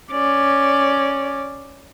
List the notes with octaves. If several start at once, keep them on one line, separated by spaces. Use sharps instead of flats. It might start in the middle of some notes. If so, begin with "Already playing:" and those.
C#4 D5